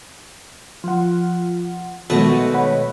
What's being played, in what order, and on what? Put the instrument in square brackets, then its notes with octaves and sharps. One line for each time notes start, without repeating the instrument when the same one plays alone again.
[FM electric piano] F3 F#5 [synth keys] F4
[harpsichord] B1 B2 B4 [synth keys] D#3 G#3 [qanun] A3 F#4 D#5
[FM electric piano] C#5 F#5 B5